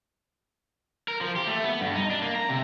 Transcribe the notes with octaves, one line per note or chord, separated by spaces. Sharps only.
A#4
F3
G4
A3
B3
G2
D#4
D4
A#3
A#5
C3